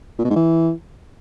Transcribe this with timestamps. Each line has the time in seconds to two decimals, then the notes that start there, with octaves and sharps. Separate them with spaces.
0.19 A#2
0.24 B2
0.30 G#2
0.36 E3